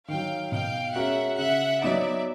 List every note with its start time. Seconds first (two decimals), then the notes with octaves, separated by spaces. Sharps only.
0.08 D#3 F#3 F5 G5
0.51 B2 F5 G5
0.95 G#3 C#4 F#4 A#4 E5 F#5
1.38 C#3 E5 F#5
1.81 F#3 B3 D#4 D5 E5